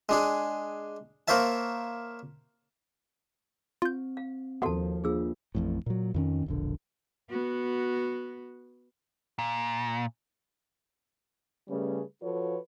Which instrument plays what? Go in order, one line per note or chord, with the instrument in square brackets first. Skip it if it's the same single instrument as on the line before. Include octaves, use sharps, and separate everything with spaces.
[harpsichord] G#3 D4 G#4
A#3 A#4 C5 C#5 E5 A5
[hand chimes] C4 [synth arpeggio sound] F4 G6
[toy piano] F5
[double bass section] D#2 F3 [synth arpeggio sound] B3 E5 C6 [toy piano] F#4 A4 A5
[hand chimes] A#3 D4 F4 [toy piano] G#4 E6
[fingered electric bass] A1 F2 A2
A#2 F#3
F2 D#3 C#4
E1 A#1 D3
[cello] B3 F#4
[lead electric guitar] A#2
[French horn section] C#3 G3 A3 C#4 G#4 B4
F3 F4 F#4 A4 B4 C#5